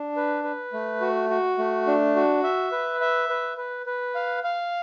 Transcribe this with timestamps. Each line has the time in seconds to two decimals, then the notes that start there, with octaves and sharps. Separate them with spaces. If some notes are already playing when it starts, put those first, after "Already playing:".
Already playing: D4
0.16 B4
0.44 B4
0.73 A3
1.01 F#4
1.30 F#4
1.58 A3
1.87 D4
2.16 F#4
2.44 E5
2.72 B4
3.01 E5
3.29 B4
3.57 B4
3.86 B4
4.15 F5
4.44 F5